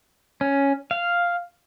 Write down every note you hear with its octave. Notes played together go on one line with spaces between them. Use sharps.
C#4
F5